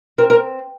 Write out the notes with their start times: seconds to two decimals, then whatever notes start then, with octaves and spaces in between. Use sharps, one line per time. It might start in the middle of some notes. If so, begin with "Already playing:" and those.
0.18 C4 A#4
0.30 A#4